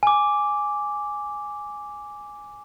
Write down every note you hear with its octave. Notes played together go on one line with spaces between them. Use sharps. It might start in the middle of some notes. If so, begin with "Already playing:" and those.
G#5 D6